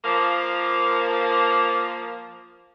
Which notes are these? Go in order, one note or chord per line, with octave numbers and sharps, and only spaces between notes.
F3 A#3